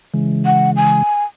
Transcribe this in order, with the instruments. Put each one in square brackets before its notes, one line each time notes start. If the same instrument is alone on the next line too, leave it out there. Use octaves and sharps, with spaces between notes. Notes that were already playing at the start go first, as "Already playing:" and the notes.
[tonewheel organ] C#3 E3 G#3
[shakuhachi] F#5
G#5